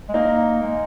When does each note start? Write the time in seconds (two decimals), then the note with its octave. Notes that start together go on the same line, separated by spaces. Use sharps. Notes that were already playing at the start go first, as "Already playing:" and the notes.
0.09 G#3
0.14 A#3 D#4
0.62 G#3